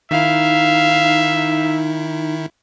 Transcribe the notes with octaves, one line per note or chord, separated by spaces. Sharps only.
D#3 D#4 E4 E5 F5